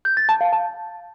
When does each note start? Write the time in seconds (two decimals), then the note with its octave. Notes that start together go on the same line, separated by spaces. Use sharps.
0.05 G6
0.17 A6
0.29 A5
0.41 F5
0.53 A5